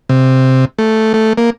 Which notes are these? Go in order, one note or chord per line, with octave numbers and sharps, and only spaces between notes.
C3
A3
A3
A#3